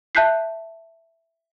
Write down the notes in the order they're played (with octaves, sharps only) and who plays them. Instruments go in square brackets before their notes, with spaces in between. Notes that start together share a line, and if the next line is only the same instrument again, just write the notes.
[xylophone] E5 A5 F#6 G6 B6 C7